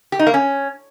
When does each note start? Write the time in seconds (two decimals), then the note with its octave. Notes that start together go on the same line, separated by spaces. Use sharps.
0.12 G4
0.19 D#4
0.27 A#3
0.34 C#4